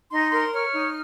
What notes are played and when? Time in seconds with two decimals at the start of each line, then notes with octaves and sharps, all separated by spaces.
0.10 D#4 C6
0.31 A#4 C6
0.52 C#5 F6
0.73 D#4